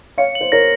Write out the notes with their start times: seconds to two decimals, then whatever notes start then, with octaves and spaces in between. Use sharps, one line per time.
0.18 C#5 F5 C#7
0.35 F#7
0.41 C5
0.52 A#4 C#5 A#6